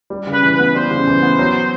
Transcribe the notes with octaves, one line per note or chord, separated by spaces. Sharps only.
G3
C#3
B4
E3
B4
B3
G3 C5
C#3
E3
B3
F#3